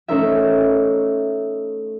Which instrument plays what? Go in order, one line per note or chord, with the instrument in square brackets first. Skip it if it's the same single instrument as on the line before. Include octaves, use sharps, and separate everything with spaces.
[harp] A3 C#4 D#4 A#4 C5 E5